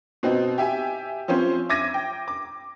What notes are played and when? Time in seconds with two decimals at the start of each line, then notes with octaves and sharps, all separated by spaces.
0.23 B2 C4 D#4
0.58 G4 E5 G#5
1.28 F3 C4 C#4 C5
1.69 E5 D6 G#6 A#6 D#7
1.94 G5
2.28 D6